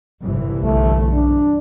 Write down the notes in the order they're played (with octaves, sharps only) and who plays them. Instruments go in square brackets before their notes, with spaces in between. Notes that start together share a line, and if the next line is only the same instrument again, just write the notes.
[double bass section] G1 C2 E3
[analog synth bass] B1 [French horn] A3
[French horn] D4